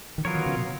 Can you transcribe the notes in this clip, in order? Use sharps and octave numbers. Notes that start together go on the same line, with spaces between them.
D#3
F3 F#3 B3 F4 A#4 C#5
D#3
C#3
B2